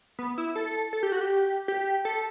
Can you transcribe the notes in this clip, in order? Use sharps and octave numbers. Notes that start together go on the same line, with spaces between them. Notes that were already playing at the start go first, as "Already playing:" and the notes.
B3
E4
A4
A4
G4
F#4
G4
G4
A4